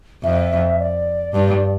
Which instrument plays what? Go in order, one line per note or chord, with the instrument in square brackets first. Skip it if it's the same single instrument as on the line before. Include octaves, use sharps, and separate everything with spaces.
[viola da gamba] F2 [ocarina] E5
[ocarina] D5
[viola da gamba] G2